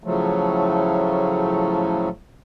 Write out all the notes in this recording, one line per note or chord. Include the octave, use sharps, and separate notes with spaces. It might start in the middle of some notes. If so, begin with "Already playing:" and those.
A2 C#3 F3 F#3 A3